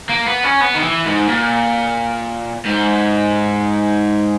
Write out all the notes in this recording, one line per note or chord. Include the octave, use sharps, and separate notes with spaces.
A#3
B3
C#4
B3
D#3
E3
G#2
A#2
G#2